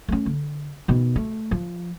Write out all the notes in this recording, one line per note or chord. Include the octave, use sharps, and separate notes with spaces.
A3 C#4
D3
B2 D#3
A3
F3